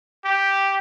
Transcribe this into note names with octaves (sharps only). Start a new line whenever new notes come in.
G4